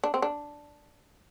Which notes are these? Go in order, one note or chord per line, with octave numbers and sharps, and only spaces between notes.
D4
C4
D4